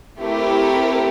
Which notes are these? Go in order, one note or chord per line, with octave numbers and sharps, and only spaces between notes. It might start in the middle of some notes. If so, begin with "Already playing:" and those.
A3 C4 E4 G4 A#4